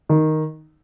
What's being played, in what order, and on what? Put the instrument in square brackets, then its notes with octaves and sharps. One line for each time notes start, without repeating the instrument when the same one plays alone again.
[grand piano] D#3